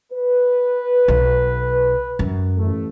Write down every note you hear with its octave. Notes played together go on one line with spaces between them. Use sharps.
B4
B1
F#2
A1 A3